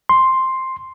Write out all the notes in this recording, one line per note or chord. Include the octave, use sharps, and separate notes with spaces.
C6